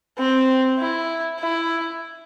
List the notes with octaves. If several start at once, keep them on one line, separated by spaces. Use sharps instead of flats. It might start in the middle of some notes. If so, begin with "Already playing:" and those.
C4
E4
E4